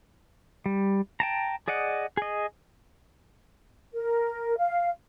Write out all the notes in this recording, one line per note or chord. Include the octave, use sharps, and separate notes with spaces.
G3
G5 A5 A#5
G#4 D5 D#5 F#5
G#4 D#5
A#4
F5